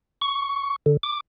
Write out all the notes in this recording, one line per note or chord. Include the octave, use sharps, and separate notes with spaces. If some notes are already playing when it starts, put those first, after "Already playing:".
C#6
D3
D6